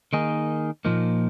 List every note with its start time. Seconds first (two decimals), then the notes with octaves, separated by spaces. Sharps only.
0.13 D#3 A#3 D#4 G#4
0.85 A#2 F3 A#3 D#4